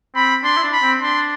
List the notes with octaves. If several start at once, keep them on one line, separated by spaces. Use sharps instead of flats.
C4 B5
D4 C6
E4
D4
B5
C4
D4 C6